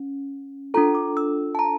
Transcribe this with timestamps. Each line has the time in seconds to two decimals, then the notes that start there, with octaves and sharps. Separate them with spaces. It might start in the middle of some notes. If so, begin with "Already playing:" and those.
Already playing: C#4
0.74 D4 F4 A4 A#5
0.95 D6
1.17 E6
1.55 A5
1.59 A#5